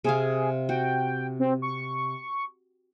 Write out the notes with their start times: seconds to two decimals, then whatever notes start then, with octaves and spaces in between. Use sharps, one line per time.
0.04 C3 C4 G#4 F5
0.69 F#4 G5
1.39 C4
1.62 C#6